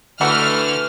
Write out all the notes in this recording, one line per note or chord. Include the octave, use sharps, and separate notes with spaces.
D3 E3 A3 F#4 B4 F6